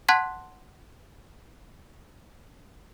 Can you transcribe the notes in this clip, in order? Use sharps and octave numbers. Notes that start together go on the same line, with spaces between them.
F#5 A5 C6 F#6 G#6 B6